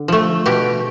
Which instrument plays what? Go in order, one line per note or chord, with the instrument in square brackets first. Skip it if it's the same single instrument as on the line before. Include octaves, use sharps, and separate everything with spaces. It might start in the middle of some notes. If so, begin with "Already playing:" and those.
Already playing: [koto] D3
F3 A3
B2 G4